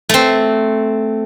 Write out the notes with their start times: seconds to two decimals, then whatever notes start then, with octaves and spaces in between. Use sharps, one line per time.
0.09 A3 C4